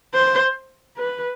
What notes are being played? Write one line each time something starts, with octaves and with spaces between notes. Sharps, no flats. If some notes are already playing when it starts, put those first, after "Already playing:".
C5
B4